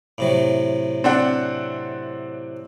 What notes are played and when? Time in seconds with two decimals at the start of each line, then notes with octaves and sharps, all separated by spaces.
0.18 A2 C3 F#3
1.04 C4 D4 F#5